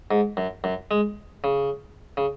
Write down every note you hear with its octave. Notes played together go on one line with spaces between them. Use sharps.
G#2
F#2
F#2
G#3
C#3
C#3